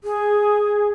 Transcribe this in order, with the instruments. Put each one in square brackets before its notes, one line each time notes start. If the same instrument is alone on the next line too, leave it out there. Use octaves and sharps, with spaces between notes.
[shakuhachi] G#4